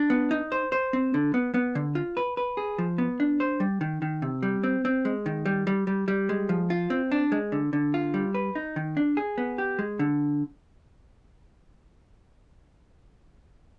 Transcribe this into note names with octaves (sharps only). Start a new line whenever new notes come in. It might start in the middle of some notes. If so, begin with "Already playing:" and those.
Already playing: D4
B3
D#4
C5
C5
C4
D3
B3
B3
D3
F4
B4
B4
G#4
F3
B3
D4
C5
G3
D#3
D#3
C3
G3
C4
C4
G#3
D#3
G3
G3
G3
G3
G#3
F3
F4
C4
D4
G#3
D3
D3
F4
G3
B4
D#4
D#3
D4
G#4
B3
G4
G#3
D3